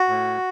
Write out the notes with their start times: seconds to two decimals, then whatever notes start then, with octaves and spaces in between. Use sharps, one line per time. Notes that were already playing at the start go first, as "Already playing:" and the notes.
Already playing: F#4
0.08 A2